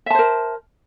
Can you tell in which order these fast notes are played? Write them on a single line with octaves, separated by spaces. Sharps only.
E5 A5 C5 A#4